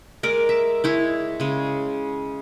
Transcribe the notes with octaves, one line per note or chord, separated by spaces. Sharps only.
G#3 A#4 D5 D6
E5
G#3 E4 C#5
C#3 G#3